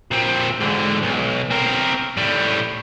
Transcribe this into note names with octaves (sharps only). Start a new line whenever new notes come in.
A#2 C4
G#2 D3
B1
C4 A#4
A2 G3